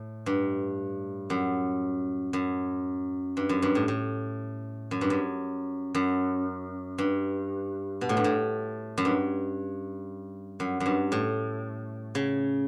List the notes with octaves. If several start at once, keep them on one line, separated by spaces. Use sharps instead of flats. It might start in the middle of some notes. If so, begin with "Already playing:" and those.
Already playing: A2
G2
F#2
F#2
G2
F#2
G2
A2
A2
F#2
G2
F#2
F#2
G2
B2
A2
G2
A2
F#2
G2
F#2
F#2
G2
A2
C#3